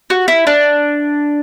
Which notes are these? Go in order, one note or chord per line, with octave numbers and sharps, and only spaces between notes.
F#4
E4
D4